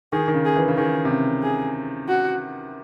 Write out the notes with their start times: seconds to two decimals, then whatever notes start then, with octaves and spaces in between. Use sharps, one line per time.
0.12 D#3 G#4
0.28 D#3
0.34 C#3
0.45 G#4
0.56 E3
0.68 C#3
0.77 D#3 G#4
1.05 C3
1.10 C#3
1.43 G#4
2.08 F#4